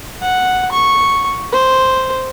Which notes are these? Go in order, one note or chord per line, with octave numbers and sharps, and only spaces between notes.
F#5
C#6
C5